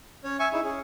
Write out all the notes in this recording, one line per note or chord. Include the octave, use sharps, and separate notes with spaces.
C#4 C#5
E5 G#5 C#6
D#4 E4 G#4
C#4 G#4